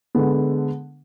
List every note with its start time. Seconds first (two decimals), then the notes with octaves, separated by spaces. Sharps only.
0.15 D3 G#3 B3